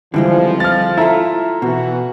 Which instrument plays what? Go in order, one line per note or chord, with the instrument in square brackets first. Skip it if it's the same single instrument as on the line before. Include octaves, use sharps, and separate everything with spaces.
[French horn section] F2 F3 [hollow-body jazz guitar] D3 G3 G#3 [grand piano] E3
[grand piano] F6 A6
[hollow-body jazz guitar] E4 F4 [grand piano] A4 E5 A#5
[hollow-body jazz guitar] B2 [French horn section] E3 F#4